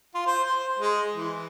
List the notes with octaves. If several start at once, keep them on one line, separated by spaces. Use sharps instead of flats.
F4
C5
C5
G#3
E3